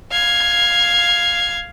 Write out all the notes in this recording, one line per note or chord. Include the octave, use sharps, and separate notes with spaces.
F5 G#6